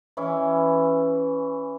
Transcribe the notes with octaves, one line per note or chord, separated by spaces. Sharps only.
E3 C#4 E4